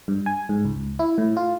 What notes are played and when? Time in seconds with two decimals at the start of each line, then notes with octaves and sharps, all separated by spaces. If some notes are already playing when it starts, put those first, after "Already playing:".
0.08 G2
0.26 G#5
0.49 G#2
0.65 C#2
0.99 E4
1.18 A2
1.37 F4